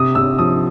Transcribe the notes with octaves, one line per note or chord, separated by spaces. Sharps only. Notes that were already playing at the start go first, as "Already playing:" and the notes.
Already playing: C3 D#6
C3 E6
F3 D#6